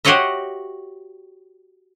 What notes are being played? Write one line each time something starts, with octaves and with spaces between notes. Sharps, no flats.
F#4 G4 C5 C#5 D#5 E5